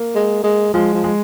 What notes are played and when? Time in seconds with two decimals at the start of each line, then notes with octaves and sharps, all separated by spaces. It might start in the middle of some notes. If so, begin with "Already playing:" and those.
Already playing: A#3
0.15 G#3
0.44 G#3
0.74 F3 G#3
0.94 F3
1.04 G#3